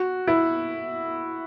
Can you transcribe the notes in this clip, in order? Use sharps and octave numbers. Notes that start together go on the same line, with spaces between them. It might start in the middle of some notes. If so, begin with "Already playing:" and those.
Already playing: F#4
E4